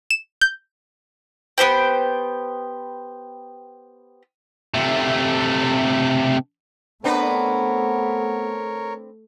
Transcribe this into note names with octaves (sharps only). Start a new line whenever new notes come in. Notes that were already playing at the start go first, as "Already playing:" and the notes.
E7
G6
B3 G4 C5 G5
C3 A3
A3 B3 C4 D4 A#4 B4 C#5